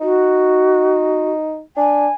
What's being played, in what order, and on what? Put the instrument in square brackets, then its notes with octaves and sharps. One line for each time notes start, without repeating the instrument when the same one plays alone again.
[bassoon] D#4 [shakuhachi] F#4
[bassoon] D4 [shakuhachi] G#5